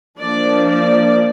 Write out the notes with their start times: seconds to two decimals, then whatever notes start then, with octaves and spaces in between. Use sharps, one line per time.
0.18 F3 A#3 D4 D5
0.67 D5